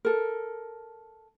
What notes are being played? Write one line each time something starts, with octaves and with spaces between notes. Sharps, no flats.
A4 A#4